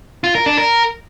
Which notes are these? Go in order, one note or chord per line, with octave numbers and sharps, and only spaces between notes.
F4
A#4
D4
A#4